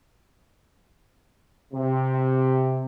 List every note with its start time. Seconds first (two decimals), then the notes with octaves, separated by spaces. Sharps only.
1.73 C3